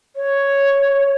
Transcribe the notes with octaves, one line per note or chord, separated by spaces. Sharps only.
C#5